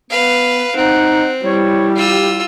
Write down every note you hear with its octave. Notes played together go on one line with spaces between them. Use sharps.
B3 B4 F5
C4 D#4 F#5
G3 E4 C#5
F4 G4 E6